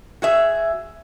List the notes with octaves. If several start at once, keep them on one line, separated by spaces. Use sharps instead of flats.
F#4 G#4 E5